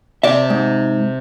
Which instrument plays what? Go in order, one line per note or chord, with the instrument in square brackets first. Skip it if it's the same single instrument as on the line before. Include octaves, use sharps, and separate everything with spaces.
[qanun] C3 A5 [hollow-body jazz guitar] D5 E5
[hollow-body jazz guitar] G#2